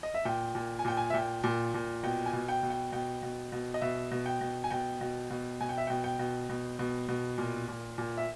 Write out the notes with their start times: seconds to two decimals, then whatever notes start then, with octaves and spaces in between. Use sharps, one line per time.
0.03 D#5
0.14 E5
0.25 A#2 G5
0.55 A#2
0.79 G#5
0.85 A#2 G5
0.97 G#5
1.10 E5
1.14 A#2 G5
1.44 A#2
1.74 A#2
2.03 B2 G5
2.26 G#5
2.33 B2
2.49 G5
2.63 B2
2.70 G5
2.92 B2 G5
3.23 B2
3.52 B2
3.74 D#5
3.81 B2 E5
4.11 B2
4.26 G5
4.41 B2
4.64 G#5
4.71 B2 G5
5.01 B2
5.30 B2
5.61 B2 G#5
5.69 G5
5.78 E5
5.87 B2 G5
6.04 G5
6.19 B2
6.49 B2
6.79 B2
7.08 B2
7.38 A#2
7.68 A#2
7.98 A#2
8.17 E5